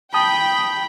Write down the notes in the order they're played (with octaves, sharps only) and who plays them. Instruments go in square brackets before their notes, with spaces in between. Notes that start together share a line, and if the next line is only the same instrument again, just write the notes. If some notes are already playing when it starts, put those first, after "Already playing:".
[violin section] G5 [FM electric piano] A5 D#6 [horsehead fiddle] B5